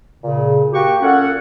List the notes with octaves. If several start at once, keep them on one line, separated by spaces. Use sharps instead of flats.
A#2 C#3
A#3 F#4 G4 G5 C#6
A#2 C#4 A4 F#5